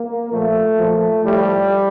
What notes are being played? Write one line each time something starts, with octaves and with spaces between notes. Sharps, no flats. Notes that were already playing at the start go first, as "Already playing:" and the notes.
Already playing: A#3
A#2 F3 A3
A#2 F3
A2 F3 G3